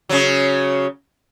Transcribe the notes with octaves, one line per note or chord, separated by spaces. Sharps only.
C#3 F#3